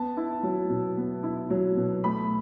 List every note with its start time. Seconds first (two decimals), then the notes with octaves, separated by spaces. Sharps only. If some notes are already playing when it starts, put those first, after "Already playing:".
Already playing: B3 A5
0.17 E4
0.43 F#3
0.69 B2
0.97 B3
1.23 E4
1.50 F#3
1.76 B2
2.04 A3 B5